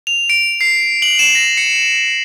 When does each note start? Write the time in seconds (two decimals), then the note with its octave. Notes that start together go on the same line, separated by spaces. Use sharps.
0.07 F7
0.30 D7
0.61 C7
1.02 F#7
1.19 E7
1.35 A#6
1.57 C#7